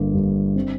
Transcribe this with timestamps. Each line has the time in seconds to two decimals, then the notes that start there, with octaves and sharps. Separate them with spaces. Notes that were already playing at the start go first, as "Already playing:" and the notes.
Already playing: G1 A#3
0.14 G2
0.56 C4